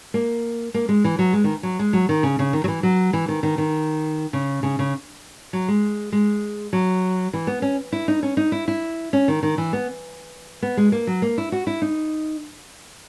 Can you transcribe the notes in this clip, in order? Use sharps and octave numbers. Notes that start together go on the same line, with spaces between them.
A#3
A#3
G#3
E3
F#3
G#3
D#3
F#3
G#3
F#3
D#3
C#3
C#3
D#3
F#3
E3
F#3
E3
D#3
D#3
D#3
C#3
C#3
C#3
F#3
G#3
G#3
F#3
E3
B3
C#4
E4
D#4
C#4
D#4
E4
E4
C#4
D#3
D#3
E3
B3
B3
G#3
A#3
F#3
A#3
E4
F#4
E4
D#4